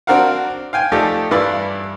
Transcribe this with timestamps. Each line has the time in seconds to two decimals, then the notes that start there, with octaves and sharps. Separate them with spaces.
0.07 C4 D4 F#4 A#4 F5 F#5
0.73 F5 G5 G#5
0.92 F3 A3 D#4 G4 A4 D5
1.31 G2 E3 E4 F4 D5 B5